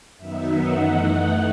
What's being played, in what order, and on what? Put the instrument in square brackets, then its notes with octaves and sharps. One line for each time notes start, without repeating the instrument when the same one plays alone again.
[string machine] F#2 D#3 F#3 B3 D#4 E5
F#5
F#2 E3 A3 D#4 F#5